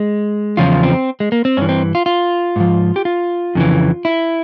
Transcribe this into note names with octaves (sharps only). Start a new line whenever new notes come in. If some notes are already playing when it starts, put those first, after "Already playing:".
Already playing: G#3
E2 C#3 F3 F4
C4
G#3
A#3
C4
G2 E3 C#4
C4
F4
F4
G#2 F3
G4
F4
F2 C#3 E3
E4